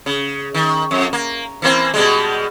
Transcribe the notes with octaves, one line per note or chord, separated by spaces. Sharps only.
C#3
D#3
F2
A#3
E3 A#3 C4
B2 G3 G#3